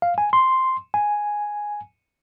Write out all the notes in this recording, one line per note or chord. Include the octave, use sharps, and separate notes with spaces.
F5
G#5
C6
G#5